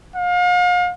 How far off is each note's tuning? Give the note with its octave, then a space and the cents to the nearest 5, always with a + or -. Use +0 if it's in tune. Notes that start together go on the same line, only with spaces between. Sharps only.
F5 +40